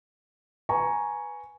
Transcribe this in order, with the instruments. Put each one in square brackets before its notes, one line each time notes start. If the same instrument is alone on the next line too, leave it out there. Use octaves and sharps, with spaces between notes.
[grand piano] B4 G#5 A#5 C#6